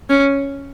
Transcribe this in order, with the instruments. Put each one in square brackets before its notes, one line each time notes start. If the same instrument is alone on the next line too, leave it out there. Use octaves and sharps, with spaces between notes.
[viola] C#4